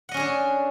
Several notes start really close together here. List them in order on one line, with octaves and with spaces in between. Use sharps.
F#5 D#5 C#4 G#4 D4